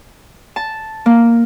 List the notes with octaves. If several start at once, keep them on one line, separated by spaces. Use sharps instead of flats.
A5
A#3